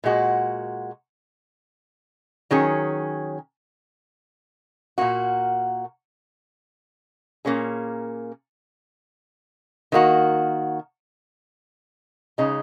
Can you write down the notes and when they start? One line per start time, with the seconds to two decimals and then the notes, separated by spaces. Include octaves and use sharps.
0.04 A#2 G#3 F#4
2.51 D#3 F#3 C#4 G#4
4.98 A#2 A#3 F#4
7.45 A#2 A#3 C#4 G#4
9.92 D#3 A#3 F#4
12.38 C#3 G#3 D#4